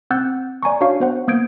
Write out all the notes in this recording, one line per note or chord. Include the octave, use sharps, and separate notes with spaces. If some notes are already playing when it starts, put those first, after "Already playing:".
C4 F#5 E6 F#6 G6 A6
D5 G#5 A#5 C#6
D4 F#4 C#5 F5 C#6
B3 C5 F#5
A#3 B3 D#6 G6 G#6 D7